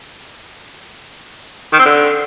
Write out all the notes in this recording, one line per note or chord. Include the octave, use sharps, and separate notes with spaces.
D#3
C4
D3